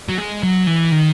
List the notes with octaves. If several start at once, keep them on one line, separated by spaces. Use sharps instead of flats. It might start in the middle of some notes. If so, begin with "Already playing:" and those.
F#3
G#3
F#3
E3
D#3